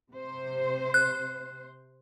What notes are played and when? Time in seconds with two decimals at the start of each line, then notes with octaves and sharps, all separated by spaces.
0.11 C3 C5
0.94 F#6